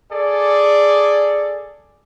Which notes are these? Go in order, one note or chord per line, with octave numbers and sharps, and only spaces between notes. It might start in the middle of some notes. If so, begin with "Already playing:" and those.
G#4 A4 D5